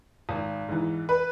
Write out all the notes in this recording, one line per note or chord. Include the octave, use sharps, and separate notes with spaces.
G#1
G#2 E3
B4